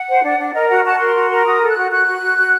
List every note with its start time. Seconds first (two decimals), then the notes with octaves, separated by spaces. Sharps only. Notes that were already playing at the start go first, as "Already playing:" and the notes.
Already playing: F#5
0.09 C5
0.23 D4
0.39 D4
0.54 A#4 D#5
0.69 F#4 F#5
0.84 F#4 A5
0.99 A#4 C6
1.15 F#4
1.30 A#4
1.46 F#4 D#6
1.61 A4
1.68 F#6
1.77 F#4
1.91 F#4 F#6
2.06 F#4
2.22 F#4
2.37 F#4